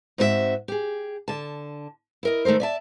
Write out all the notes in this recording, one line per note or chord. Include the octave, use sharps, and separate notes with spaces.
G#2 C4 F#4 G4 E5
G4 G#4
D3 A5
E4 A#4 D#5
D#3 A3 A4 A#4 C5
D5 E5 A5